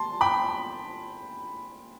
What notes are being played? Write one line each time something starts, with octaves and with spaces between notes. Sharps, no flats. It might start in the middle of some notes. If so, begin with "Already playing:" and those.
Already playing: A5 C6
G5 B5